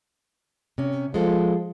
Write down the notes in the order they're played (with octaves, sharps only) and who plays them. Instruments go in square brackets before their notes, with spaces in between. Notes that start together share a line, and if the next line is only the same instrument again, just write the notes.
[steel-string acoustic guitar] C3 C#4
[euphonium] F3 [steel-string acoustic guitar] G#3 A4